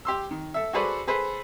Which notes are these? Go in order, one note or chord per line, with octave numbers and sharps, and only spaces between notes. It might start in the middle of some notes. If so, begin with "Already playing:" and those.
G4 C6 E6
D#3
A4 E5
F#4 G#4 A4 B4 C5 D5
G#4 A4 B4 C5